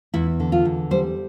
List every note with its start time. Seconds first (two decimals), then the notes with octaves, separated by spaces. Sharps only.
0.14 E2 E4
0.40 D3
0.52 F4
0.65 E2
0.91 G3 C5